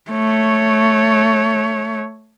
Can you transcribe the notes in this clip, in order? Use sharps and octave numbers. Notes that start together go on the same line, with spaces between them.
A3 C#5